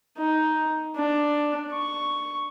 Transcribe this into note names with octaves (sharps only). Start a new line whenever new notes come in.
D#4
D4
C#6